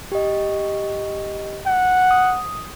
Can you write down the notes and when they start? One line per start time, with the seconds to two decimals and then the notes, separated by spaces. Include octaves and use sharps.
0.12 G4 D#5
1.66 F#5
2.11 D#6